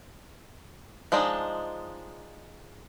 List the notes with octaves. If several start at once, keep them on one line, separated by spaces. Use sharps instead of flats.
F3 G#3 D4 D#4